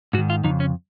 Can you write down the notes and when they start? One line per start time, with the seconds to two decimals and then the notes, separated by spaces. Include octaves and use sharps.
0.13 G#2 F#4
0.18 D#3
0.30 F4
0.44 F2 C#3 D#4
0.60 C#4